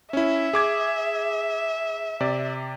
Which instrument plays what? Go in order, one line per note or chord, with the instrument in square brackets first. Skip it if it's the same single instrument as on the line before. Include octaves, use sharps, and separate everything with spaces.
[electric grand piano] C#4 E4 [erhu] E5
[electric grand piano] G#4 D6 G#6
C3 D5